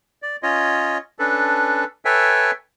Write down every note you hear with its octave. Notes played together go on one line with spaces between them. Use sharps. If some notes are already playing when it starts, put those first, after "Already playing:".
D5
C#4 F4 C#5 D#5
C#4 D4 A4 B4
A4 B4 C#5 E5 G5 G#5